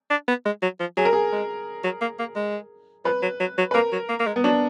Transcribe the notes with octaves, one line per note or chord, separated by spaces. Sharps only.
D4
B3
G#3
F#3
F3
F#3 G#4
A#4
G#4
G#3
F#3
A#3
A#3
G#3
F3 B4
F#3
F#3
F#3
B4
A#3 A#4
F#3
A#3
A#3
G#3
B3
F#3 D4